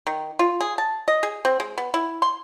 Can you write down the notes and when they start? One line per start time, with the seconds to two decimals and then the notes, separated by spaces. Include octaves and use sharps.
0.07 D#3
0.39 F4
0.61 G#4
0.78 A5
1.08 D#5
1.23 G#4
1.45 C4
1.60 G#3
1.78 B3
1.94 E4
2.22 C6